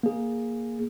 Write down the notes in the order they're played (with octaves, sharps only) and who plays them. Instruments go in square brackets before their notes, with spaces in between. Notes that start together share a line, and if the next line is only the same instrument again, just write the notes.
[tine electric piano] A#3 G#4